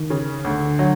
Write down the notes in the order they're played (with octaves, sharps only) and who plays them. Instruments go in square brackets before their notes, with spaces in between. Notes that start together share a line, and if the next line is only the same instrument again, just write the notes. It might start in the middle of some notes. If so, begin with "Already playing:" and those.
Already playing: [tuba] D#3
[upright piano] C#3
[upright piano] D2 [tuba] D3
[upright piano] F#3